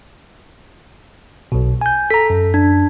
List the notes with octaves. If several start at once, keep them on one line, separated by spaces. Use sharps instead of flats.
B1 B2
G#5 G6
A4 A#5 B6
F#2
D4